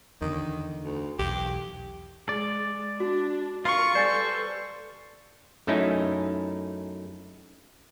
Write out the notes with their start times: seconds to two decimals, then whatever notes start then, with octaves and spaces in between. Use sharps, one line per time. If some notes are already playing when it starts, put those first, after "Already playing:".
0.21 E2 D3 D#3
0.84 D2
1.19 B1 E2 G4
2.29 G#3 D5
3.00 D4 F#4
3.65 F4 A#4 F5 C#6
3.95 G3 A4 B4 C5 D5 G#5 A6
5.67 F#2 A3 C#4 D#4 E4